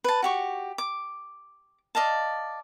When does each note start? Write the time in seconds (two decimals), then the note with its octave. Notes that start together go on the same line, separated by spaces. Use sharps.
0.04 B4 A5
0.22 F#4 G4 C#6
0.78 D6
1.95 D5 D#5 F5 A5